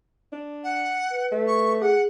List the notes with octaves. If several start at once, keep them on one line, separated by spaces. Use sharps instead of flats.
D4
F#5
B4
A3
C#6
G#4 F#5